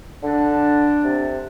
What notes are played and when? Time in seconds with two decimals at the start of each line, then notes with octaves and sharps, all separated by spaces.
0.23 D3 D4
1.04 C3